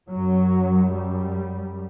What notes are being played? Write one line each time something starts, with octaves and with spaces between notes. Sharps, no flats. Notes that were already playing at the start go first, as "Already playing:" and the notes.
F#2 F#3
G3